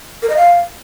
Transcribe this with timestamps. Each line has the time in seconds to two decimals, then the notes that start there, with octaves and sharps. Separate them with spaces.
0.23 A#4
0.30 D#5
0.37 F5